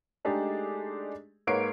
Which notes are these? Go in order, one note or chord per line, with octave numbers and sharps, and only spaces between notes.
G#3 A3 D4 D#4 G4 G#4
G#2 A#3 B4 C#5 C7 D7